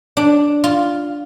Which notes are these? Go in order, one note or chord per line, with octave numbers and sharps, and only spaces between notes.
D4
F4